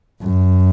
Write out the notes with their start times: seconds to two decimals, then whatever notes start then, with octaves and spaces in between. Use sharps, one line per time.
0.22 F#2